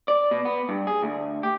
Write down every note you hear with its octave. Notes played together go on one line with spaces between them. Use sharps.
D5
B2
B3
G2
G#4
D2
G4